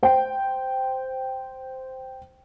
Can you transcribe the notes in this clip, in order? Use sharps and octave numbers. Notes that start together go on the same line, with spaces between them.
C5 G5